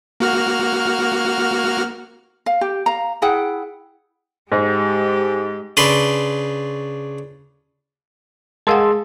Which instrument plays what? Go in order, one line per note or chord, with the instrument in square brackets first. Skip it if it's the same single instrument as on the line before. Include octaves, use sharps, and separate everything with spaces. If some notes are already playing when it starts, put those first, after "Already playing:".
[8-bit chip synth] A#3 F#4 F6
[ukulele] F5
G4
F5 A#5
E4 G#4 F#5 G5
[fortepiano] G#2 [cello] G#3 G4
[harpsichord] C#3 D4 B4 C6
[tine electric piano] G#3 G#4 [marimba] A#4 F5 F#5 [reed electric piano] A5 C6 E6